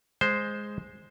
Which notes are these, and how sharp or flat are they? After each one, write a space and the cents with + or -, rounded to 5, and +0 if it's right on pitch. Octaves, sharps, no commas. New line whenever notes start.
G#3 +0 C5 +0